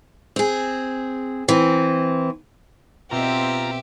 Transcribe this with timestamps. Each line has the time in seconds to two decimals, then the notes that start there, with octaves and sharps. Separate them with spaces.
0.36 C4 G#4
1.48 E3 C4
3.11 B2 C4 F4 G4 E5 A#5